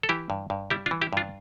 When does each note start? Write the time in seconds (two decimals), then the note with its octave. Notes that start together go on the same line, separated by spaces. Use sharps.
0.03 A4
0.09 E3 E4 G4
0.30 G2
0.50 G2
0.70 G3 E4 G4
0.86 D4 F4
0.91 E3
1.01 E4 G4
1.13 G2 D4 F4